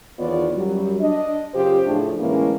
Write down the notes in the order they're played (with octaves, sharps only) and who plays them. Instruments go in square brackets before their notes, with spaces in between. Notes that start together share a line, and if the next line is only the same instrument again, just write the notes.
[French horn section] E2 D#3 B3 F4 C#5 D5
F#2 F#3 G3
D4 D#5
F#2 C#3 F4 G4 C5
A2 F3 A3 D4 G#4
A2 D3 E3 G#3 A#3 C#4